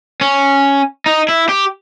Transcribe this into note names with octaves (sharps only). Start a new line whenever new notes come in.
C#4
D#4
E4
G4